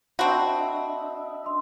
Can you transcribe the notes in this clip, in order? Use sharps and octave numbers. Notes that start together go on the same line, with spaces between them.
C4 D4 F#4 D#5 E5 A5 B5
C6